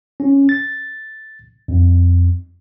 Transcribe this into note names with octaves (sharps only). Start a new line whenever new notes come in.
C#4
A6
F2